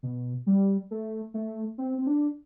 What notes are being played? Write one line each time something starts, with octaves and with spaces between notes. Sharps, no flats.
B2
G3
A3
A3
C4
C4
D4